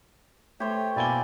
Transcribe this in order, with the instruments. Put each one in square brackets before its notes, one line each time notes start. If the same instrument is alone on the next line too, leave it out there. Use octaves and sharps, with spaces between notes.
[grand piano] A3 [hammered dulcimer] G4 C5 [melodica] C#5
[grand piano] B2 G#5 G7 [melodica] A#3 E4 D5